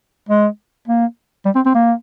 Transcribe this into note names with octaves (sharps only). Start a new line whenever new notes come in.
G#3
A#3
G3
C4
C4
A#3